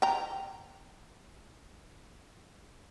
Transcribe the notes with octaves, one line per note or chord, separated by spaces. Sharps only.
G5 A#5